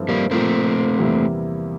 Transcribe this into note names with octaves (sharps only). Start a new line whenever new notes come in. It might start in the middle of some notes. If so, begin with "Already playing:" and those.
Already playing: G2 F3 C4 E4 A4
G3 A#3
A#2 F3 A3 A#3 C4 F4 A#4
E2 C3 G3 A#3 E4